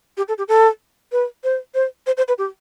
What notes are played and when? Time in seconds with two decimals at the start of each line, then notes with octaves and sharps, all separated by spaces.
0.17 G4
0.28 A4
0.38 G4
0.48 A4
1.12 B4
1.44 C5
1.74 C5
2.06 C5
2.17 C5
2.28 B4
2.38 G4